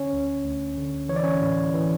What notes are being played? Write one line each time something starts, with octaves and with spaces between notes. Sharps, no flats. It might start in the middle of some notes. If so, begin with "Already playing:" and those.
Already playing: D3 C#4 C#5
D2
D2
D3
E3 C#5
D5
C#4 C#5
A2
E3